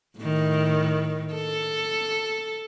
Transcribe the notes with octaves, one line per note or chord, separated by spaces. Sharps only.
A2 D#3
A4